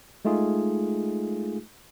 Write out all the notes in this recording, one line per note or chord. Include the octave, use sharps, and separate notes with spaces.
G#3 A3 D#4 F4 G#4